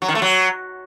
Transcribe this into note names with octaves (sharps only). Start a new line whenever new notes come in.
F#3
D#3
A3
F#3